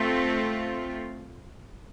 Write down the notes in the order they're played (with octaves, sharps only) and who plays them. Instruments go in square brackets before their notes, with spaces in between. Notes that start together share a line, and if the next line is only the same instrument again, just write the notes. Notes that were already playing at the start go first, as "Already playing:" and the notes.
Already playing: [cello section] A3 C4 F4